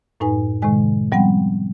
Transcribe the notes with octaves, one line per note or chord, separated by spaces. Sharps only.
F#2 A2 D#4 B4 G#5
A2 C3 D#3 G#3 G#5
F3 G3 B3 C4 F#5 G5